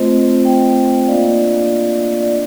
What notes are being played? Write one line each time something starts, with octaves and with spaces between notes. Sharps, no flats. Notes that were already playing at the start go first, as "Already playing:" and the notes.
Already playing: A3 C4 F4 C5 D#5
D#5 G5
D#5
A#3 D4 F4 D5 F5
D5